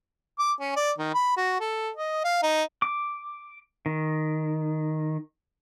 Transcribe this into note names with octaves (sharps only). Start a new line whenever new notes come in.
D6
C#4
D5
D#3
B5
F#4
A4
D#5
F5
D#4
D6
D#3